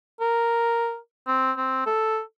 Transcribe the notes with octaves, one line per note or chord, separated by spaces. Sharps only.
A#4
C4
C4
A4